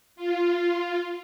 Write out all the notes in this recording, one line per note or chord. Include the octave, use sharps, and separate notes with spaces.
F4